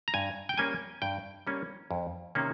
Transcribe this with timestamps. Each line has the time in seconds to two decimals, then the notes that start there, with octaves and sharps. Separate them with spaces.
0.08 A#5
0.14 G2 G#5
0.49 G5
0.57 G3 A#3 C#4 G#5
1.02 G2 G5
1.47 G3 A#3 C#4
1.91 F2
2.35 C3 D#3 A#3 C#4